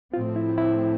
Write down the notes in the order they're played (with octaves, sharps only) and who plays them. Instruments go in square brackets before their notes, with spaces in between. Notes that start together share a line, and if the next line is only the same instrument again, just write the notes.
[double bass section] A2 F3 A3 C4 [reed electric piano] F4
[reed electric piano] E4
E4